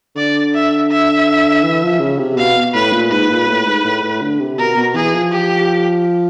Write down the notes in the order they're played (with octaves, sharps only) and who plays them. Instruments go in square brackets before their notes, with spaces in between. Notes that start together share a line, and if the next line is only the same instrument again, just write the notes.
[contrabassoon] D3 [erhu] D5
[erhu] E5
E5
[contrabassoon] E3
F3
C#3
C3
[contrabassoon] B2 [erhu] F5
[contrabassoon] A2 [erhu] B4
[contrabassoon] A#2
[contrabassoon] G#2 [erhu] B4
[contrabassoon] A#2
A2
G#2
A2
A2
D3
C3
[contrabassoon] B2 [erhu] A#4
[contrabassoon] B2
[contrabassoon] E3 [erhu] G#4
[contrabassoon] F3
[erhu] G4